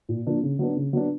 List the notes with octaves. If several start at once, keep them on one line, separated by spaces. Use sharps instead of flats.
A#2
F3 A#3 D4
C#3
F#3 B3 D4
C#3
F#3 B3 D4